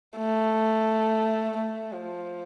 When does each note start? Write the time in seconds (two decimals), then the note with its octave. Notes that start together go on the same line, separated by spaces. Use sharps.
0.17 A3
1.57 A3
1.93 F3